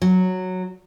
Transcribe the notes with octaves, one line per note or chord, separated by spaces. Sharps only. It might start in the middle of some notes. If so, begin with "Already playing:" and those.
F#3